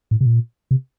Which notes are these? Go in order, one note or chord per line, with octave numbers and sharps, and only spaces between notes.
A2
C3
A#2
C3